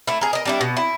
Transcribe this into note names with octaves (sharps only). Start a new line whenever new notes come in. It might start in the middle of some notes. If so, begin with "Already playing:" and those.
A3 E4
G#4 A#4
A#4 D#5
G3 D4 E4
B2
E4